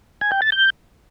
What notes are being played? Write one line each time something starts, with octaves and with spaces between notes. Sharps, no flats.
G#5
G5
A6
G6